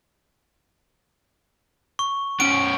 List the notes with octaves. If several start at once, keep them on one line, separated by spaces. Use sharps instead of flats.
C#6
B3 C#4 D7